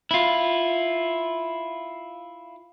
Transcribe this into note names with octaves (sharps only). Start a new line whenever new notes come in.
E4 F4